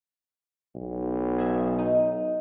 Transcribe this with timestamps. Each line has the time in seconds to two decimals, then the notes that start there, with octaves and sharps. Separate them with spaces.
0.75 B1
1.38 G#4 E5
1.79 D#4